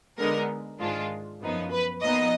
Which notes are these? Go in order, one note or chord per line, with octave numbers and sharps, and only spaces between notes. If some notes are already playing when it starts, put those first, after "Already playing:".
D3 G#3 B3 D#4 A#4
G#2 D#3 G#3 D4 F4
F#2 F3 B3 D#4
B4
A#2 F3 B3 D#4 D#5